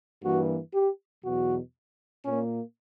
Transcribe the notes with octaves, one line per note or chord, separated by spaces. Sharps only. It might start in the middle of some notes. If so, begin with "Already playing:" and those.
G2 E3 A#3 F#4
G4
E2 B2 F#3 F#4
A#2 A#3 C#4